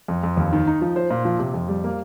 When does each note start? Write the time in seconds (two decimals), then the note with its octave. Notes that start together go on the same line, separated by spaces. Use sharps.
0.08 F2
0.23 F2
0.37 D#2
0.53 D#3
0.67 D#4
0.82 F3
0.96 C5
1.10 A#2
1.25 F3
1.39 C3
1.54 F2
1.68 G3
1.84 A#3